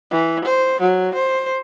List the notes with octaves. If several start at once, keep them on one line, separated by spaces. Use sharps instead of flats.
E3
C5
F#3
C5